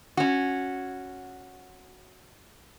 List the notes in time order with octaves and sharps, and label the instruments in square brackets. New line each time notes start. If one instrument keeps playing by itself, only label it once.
[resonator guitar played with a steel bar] C#4 F#4